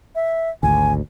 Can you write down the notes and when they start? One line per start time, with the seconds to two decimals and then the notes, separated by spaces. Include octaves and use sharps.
0.15 E5
0.63 G#1 D2 G#5